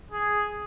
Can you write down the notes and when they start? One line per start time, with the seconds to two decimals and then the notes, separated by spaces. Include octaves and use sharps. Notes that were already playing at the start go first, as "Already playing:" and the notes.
0.11 G#4